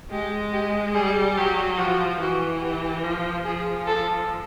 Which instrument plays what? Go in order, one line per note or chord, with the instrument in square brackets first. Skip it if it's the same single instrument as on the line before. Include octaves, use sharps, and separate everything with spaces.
[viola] G#3 [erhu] G4
[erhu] G4
[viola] G3 [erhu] G#4
[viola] F#3 [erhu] G4
[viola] F3 [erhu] F#4
[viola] E3 [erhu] F#4
[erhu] G4
[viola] F3
[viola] F3 [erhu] G#4
[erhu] A4